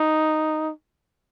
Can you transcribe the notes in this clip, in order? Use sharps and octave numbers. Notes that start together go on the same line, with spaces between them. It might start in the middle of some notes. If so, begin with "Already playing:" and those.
Already playing: D#4